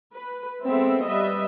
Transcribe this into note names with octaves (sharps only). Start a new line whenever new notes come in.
B4
G#3 B3 C4 A4 E5
G3 B4 D#5 E5